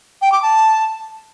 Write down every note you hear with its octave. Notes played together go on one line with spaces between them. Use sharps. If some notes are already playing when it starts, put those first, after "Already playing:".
G5
D6
A5